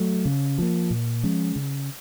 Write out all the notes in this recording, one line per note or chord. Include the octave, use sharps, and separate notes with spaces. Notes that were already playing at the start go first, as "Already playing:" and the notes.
Already playing: F#3 A3
C#3
F3 A#3
A#2
F3 G#3 C#4
C#3